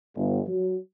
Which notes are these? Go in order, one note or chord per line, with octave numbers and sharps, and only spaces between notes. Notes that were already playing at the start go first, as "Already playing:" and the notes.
G1
F#3